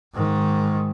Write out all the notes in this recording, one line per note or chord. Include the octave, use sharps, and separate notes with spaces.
G#2 D#3